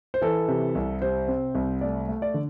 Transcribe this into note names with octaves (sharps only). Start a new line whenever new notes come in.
C5
E3 A4
C3
C2
C3 C5
C4
C2
A3 D5
A3
D5
D3